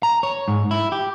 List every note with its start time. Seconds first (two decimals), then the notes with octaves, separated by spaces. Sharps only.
0.03 A#5
0.23 C#5
0.48 G#2
0.71 E4
0.92 G4